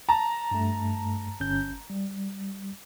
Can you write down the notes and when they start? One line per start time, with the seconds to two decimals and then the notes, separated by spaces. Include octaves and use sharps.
0.09 A5 A#5
0.51 G2 A3
1.40 G1 C#4 G6
1.90 G3